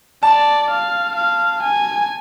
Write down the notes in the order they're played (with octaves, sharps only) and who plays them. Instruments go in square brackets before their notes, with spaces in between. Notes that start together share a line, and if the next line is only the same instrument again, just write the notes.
[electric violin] D5 [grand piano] A5
[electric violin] F5
F5
G#5